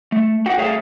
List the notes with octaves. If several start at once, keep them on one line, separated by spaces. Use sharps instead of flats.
A3
F#4 F#5 G5
A3 G#4 C#5 E5 F5